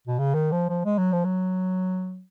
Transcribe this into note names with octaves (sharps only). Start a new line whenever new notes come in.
B2
C#3
D#3
F3
F3
G#3
F#3
F3
F#3